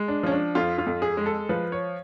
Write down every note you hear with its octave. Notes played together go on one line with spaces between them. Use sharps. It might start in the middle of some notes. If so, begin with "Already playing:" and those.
Already playing: G#3
D4
F3 C#4
D4
F2 F4
F4
F2
G#4
G#3
A4
F3 B4
C#5